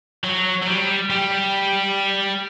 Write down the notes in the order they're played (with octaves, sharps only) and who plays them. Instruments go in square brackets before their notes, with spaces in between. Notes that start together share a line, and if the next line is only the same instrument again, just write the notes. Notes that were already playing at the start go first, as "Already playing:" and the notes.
[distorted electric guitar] F#3
F#3
G3
G3